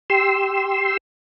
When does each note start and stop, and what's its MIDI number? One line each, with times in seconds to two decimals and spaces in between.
0.10 0.97 67
0.10 0.97 84
0.10 0.97 88